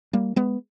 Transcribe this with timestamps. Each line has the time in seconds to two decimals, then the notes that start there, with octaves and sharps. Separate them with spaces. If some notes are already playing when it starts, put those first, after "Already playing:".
0.13 G3 A#3
0.36 G#3 B3